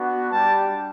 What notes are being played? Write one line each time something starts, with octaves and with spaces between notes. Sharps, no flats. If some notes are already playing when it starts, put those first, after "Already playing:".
Already playing: B3 D4 F#4
G3 D4 G4 A5